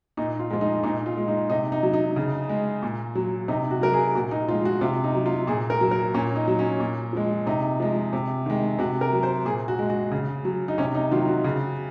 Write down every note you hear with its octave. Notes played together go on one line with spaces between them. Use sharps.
A#2 D#4
F4
F3 G#3 F4
D#4
A#2 D#4
F4
G#3
D#4
C3 D#4
D#4
F#3
D#4
C#3
G#3
A#2
F#3
C3 D#4
F#4
F#3 A#4
G#4
A#2 F#4
D#4
F3 G#3 F4
F#4
C3 F4
D#4
F#3
F4
A#2 G#4
A#4
F#3
A#4
A#2 C#4
D#4
F#3
C#4
A#2
F3 G#3
C3 D#4
F3 G#3
C3
D#3 G#3
C3 F#4
A#4
F#3
C5
A#2 G#4
F#4
G#3
F#4
C#3
F#3
D#4
C3 C#4
D#4
D#3 F#3 F4
F#4
C#3